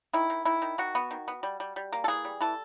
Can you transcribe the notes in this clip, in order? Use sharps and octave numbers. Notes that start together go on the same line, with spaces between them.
D#3 E4
D#3
D#3 E4
D#3
D#3 F#4
B3
D#3
B3
G3
G3
G3
A#3
A4
E3 G#4
G3
E3 A4